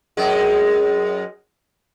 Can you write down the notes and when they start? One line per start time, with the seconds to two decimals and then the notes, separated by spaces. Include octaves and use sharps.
0.17 F#2 G#3